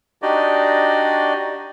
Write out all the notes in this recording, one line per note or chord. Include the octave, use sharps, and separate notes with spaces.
D4 D#4 F#4 G4 D5 D#5